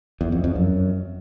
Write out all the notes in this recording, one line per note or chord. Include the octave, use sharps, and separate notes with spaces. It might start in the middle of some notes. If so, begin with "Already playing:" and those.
E2
F2
F2
F#2